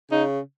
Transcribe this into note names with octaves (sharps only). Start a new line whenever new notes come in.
C#3 D#4